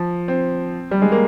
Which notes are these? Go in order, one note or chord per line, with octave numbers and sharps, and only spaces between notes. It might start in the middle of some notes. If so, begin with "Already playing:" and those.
Already playing: F3
C4
G3
G#3
A#3